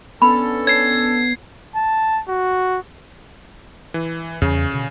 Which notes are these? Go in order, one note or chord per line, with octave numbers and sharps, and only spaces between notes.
B3 C#4 D4 A4 B5
C#5 G#6 C7
A5
F#4
E3
E2 C#3 G3
B2 D3